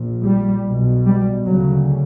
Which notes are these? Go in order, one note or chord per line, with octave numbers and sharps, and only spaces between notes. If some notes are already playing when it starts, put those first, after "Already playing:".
Already playing: A#1 A#2
G3
B1 B2
G3
D2 C#3 F#3